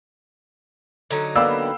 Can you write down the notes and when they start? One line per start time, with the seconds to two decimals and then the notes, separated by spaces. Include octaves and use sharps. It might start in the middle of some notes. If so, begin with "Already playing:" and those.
1.11 D3 F#3 D#4
1.36 A#3 B3 D5 F5 G5 B5 E6